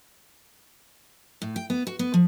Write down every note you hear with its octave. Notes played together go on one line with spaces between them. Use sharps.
A2
G5
B3
F#4
B3
F3